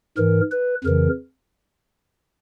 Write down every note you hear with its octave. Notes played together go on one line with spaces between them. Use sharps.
G#2 E3 A#4
B4
F2 C#3 E3 A#4